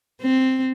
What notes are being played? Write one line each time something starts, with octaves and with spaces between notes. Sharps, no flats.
C4